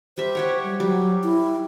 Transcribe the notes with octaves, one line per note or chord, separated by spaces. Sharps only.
G3 C5 E5
G4 C#5 F#5
G3
F#3 G3
E4